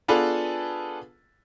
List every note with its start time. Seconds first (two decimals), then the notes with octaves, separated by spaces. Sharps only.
0.08 B3 D4 F4 G#4 A4 B4